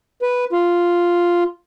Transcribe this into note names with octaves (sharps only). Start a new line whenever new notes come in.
B4
F4